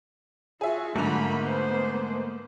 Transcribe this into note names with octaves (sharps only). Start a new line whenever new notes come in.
F4 F#4 G#4 E5
G#2 D3 F#3 A3 A#3 A#5 B5
B3 C5